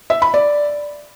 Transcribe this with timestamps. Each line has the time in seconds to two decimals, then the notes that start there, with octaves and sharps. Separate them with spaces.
0.10 E5
0.22 B5
0.34 D5